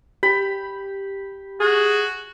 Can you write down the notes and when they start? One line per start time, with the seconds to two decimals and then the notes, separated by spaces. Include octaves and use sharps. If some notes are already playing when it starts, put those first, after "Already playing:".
0.23 G4 B5
1.60 F#4 G#4